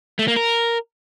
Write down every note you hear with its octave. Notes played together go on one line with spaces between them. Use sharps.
A3
A#3
A#4